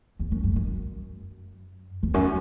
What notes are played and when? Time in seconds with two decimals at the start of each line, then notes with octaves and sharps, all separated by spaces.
0.19 E2
0.31 F#2
0.43 F#2
0.56 F#2
2.03 E2
2.14 F#2